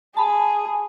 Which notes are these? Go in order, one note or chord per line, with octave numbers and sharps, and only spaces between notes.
G#4 A5 B5